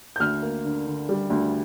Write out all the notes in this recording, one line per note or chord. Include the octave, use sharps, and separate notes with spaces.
G6
D2 F6
A#3
D3
D3
G3
D2